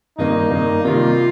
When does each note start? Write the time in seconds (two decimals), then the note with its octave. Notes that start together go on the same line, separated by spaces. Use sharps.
0.18 G2 D#3 A#3 D#4
0.50 G2 D#3 A#3
0.84 C3 D#3 G3 A#3 F4